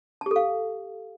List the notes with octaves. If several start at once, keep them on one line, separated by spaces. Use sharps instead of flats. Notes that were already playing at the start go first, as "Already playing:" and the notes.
G4 A4 F5 A5